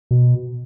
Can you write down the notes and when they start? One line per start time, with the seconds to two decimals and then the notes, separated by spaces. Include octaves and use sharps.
0.11 B2